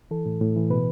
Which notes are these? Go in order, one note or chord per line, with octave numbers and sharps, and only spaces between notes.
E3 A4
A2
A2
E3
B2 B4